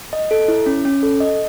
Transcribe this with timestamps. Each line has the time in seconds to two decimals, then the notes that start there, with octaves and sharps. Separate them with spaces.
0.13 D#5
0.31 A4
0.48 E4
0.66 C#4
0.85 C#4
1.03 A4
1.20 D#5